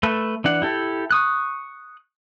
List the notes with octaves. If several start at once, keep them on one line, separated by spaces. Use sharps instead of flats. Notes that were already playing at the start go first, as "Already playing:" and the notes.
A3 A4 B4
E3 D4 F#5
E4 G4 A4
C#6 D#6 F#6